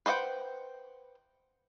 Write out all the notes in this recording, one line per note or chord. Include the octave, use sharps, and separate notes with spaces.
B4 C5 D#5 F#5 G5